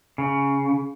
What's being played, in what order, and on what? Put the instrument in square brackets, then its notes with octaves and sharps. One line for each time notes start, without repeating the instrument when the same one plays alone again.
[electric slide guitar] C#3